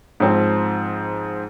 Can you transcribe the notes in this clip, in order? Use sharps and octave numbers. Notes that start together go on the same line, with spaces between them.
G#2 F3 C4